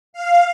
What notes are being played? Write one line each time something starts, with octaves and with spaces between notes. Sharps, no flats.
F5